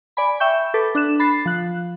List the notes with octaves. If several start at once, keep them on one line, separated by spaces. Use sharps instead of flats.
D5 G#5 B5
E5 G5 C#6 G6
A4 B4 D6
D4 F#6 E7
B5 A6 C7
F3 F#6